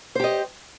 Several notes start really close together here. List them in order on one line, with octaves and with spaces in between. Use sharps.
C5 G4 D#5